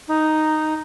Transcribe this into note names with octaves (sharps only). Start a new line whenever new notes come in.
D#4